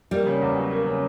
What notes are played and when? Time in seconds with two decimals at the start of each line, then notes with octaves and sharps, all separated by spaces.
0.11 G3 A#3
0.26 C#3
0.41 E2
0.56 F#3
0.71 A#3
0.86 C#3